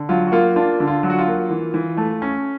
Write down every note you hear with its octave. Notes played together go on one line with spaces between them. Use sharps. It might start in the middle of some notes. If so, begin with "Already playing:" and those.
Already playing: D3
F#3 F4
F#4
A#3 F4
D4 F4
D3
F4
F#3
F#4
F4
A#3
E3
E3
A3
C#4